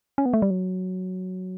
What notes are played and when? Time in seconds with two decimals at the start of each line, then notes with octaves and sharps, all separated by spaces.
0.18 C#4
0.26 B3
0.34 A3
0.42 G3
0.50 F#3